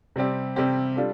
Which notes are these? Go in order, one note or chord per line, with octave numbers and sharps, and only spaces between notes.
C3 G3 C4 G4
C3 G3 C4 G4
G3 D4 F4 A4